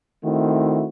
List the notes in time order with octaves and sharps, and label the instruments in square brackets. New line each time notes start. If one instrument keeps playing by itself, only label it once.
[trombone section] D#3 A3 C4 E4 F#4